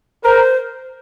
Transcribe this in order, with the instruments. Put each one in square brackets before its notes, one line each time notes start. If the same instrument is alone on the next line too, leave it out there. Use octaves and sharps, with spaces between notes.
[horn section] A#4 [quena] C5